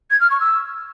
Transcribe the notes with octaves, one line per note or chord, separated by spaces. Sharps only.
G#6
F6
C#6
E6